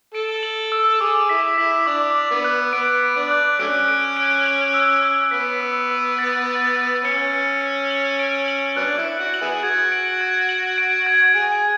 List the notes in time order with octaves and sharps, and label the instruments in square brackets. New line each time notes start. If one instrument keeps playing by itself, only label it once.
[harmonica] A4 [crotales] D7
[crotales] F#7
E6
[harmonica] G#4 [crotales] D6
[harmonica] E4 [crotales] B6
[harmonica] E4 [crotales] B6
[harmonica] D4 [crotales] D6
[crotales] D6
[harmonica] B3
[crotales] F#6
[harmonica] B3 [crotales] D7
[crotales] D7
[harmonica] D4
[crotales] F#6
[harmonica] F#3 A3 C#4 [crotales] D7
[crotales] D7
D7
F#7
E6
E6
[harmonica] B3 [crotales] B6
[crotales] E6
E6
A6
A6
E6
[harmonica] C#4 [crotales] C#7
[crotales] C#7
C#7
F#7
D7
F#7
[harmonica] F#3 B3 D4 [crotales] F#6
[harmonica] E4
[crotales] D7
[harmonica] F#4
[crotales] F#7
[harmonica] B3 E4 G#4
[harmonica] F#4 [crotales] G#6
[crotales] D7
G#6
F#7
D7
G#6
[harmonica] G#4 [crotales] D7